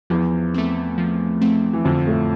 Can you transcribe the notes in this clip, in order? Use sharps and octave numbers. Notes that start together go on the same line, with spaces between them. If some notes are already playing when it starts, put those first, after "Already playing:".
E2 E3 F3
A3 C4
F3
A3 C4
E3
F2 D3 F3
A2 A3